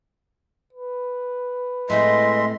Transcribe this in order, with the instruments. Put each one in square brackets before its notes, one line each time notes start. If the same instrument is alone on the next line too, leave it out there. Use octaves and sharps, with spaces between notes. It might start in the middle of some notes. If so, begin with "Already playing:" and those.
[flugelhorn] B4
[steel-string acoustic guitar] A2 A3 C4 [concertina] G#3 E5 C6 [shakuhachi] D#5